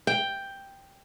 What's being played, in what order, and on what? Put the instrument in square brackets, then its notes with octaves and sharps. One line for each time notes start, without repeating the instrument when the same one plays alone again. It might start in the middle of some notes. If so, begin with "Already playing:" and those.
[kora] G5